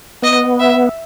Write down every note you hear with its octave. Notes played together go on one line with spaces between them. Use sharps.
B3 D#5
E5